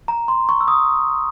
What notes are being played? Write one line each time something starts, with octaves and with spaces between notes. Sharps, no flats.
A#5
C6
C#6
E6
D#6